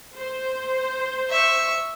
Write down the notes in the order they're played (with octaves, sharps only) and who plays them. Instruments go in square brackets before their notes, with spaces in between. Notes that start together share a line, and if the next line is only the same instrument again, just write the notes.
[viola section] C5
[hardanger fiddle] E5 C#6